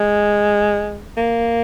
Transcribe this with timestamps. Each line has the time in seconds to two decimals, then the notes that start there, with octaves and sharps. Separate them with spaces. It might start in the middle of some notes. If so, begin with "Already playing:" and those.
Already playing: G#3
1.17 A#3